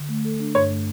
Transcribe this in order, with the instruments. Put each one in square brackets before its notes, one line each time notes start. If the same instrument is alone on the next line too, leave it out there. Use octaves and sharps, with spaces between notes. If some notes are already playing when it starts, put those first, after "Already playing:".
Already playing: [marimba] D3
A3
A4
D4
[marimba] G2 [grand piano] C#5
[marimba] A3